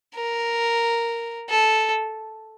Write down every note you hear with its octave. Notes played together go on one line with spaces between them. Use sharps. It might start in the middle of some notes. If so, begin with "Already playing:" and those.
A#4
A4